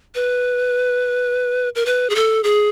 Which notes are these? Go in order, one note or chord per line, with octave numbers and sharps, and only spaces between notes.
B4
A#4
B4
G#4
A4
G#4